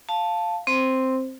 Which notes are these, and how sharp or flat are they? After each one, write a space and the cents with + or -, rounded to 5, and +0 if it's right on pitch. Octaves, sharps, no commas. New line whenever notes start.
F5 +0 A5 +0
C4 +0 C5 +0